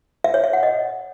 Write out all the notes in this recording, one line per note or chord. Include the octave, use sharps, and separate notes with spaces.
E5
C#5
E5
F#5
D#5